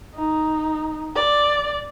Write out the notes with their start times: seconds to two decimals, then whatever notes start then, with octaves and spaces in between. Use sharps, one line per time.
0.15 D#4
1.15 D5